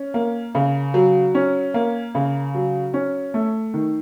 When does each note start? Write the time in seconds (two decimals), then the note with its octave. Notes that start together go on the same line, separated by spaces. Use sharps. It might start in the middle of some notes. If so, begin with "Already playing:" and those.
Already playing: C#4
0.14 A#3
0.55 C#3
0.94 F#3
1.35 C#4
1.74 A#3
2.15 C#3
2.55 F#3
2.94 C#4
3.34 A3
3.74 D#3